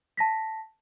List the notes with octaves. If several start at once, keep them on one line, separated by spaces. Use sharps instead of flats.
A5 A#6 B6